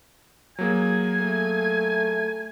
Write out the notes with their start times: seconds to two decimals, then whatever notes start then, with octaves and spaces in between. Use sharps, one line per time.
0.59 F#3 A#3 G#4 G#5
1.19 A3